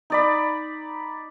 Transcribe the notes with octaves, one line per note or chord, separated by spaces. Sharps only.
D#4 D5 B5